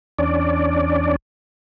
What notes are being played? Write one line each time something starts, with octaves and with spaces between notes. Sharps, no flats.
E2 C#4 D4 D5